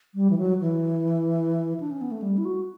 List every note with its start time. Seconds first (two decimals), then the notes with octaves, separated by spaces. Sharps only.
0.15 G3
0.30 E3
0.38 F#3
0.61 E3
1.80 D4
1.91 C#4
2.01 B3
2.11 A3
2.22 G3
2.38 E4
2.45 F#4